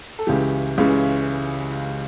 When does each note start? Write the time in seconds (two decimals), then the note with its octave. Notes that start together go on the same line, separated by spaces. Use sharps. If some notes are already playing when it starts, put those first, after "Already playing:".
0.19 A4
0.27 C#2 C#3 E3 G4
0.78 C#2 C#3 E3